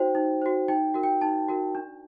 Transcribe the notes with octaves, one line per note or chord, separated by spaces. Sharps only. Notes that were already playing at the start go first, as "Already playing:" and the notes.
Already playing: D#4 F#4 C5 G5
D#4
F#4 C5
D#4 G5
F#4 A#4
G5
D#4 A5
F#4 A#4
D4